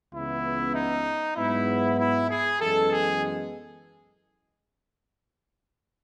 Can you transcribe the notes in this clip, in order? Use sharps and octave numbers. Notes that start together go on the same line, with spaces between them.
C#2 C#3 E3 B3 E4
D#4
G#2 F#3 B3 E4
E4
G#4
F#2 E3 G#3 B3 A4
G#4